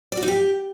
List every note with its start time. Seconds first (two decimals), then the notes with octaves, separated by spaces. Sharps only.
0.12 D5
0.17 F#4
0.23 D#4
0.28 G4